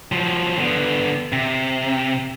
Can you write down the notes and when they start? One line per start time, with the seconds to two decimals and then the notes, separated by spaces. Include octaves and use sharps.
0.12 F3 F#3
0.59 D3 B3
1.33 C3